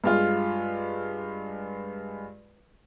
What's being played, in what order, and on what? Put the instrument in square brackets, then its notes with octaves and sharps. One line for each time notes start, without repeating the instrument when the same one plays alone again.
[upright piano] G2 G#3 F4